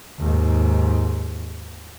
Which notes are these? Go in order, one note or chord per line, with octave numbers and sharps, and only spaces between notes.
D#2 G#2